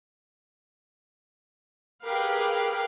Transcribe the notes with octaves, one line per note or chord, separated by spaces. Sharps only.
G4 G#4 A#4 B4 F5 G5